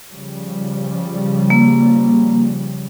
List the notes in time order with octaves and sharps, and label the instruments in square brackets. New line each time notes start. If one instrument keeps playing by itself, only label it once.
[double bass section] C#3 F3 G3
[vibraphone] A#3